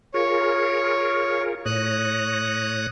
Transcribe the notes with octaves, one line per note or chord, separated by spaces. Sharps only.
F4 G#4 A#4 C#5
A2 C#5 D#6 F#6 A#6